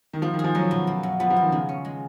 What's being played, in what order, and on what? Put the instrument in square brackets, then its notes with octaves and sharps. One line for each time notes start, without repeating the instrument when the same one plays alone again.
[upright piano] D#3
[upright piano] F3 [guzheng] F4
[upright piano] D#3
[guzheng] G#4
[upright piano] F3
[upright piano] F#3 [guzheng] C#4
[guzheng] B2
A#3
F#2
[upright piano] F3 [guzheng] B3
[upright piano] F3
[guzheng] F4
[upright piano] D#3
[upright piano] C#3 [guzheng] G#3
[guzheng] C#4
G#3